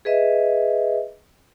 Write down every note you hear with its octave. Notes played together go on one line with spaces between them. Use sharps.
G#4 B4 D#5 E5